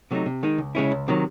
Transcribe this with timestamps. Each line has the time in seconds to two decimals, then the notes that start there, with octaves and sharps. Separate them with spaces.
0.11 C3 F#3 A3 D#4
0.26 C3
0.43 D#3 G#3 D#4
0.58 C#2
0.75 C#3 G#3 C#4 E4
0.92 C#2
1.08 C3 D#3 F#3